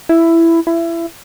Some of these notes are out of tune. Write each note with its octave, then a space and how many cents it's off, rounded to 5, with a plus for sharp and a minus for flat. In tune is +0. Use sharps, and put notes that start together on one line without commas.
E4 +10
E4 +25